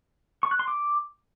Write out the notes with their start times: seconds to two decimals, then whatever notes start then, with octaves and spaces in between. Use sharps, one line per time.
0.43 C#6
0.51 F#6
0.59 C6
0.68 D6